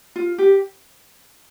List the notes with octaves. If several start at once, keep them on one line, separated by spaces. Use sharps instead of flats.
F4
G4